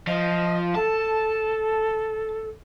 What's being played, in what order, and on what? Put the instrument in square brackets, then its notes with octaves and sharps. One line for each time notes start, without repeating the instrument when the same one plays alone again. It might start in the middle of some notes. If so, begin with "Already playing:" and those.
[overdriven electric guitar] F3 [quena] D#5
[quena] A4 [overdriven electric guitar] A5